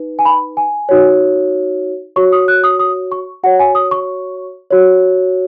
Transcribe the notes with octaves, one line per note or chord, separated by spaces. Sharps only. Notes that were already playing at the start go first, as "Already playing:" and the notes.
Already playing: D#4 B4
G#5
B5
G#5
D#4 F#4 C#5
F#4 C#5 C#6
D#6
F#6
D#6
D#6
C#6
F#4 C#5 F#5
G#5
D#6
C#6
F#4 C#5